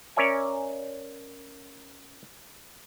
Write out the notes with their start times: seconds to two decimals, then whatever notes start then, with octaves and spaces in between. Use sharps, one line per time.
0.16 C#4 A#4 C#5 D5 E5 G#5